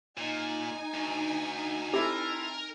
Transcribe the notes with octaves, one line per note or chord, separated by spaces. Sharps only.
A#2 D#4 G#5
D2
C4 E4 G4 A4 A#4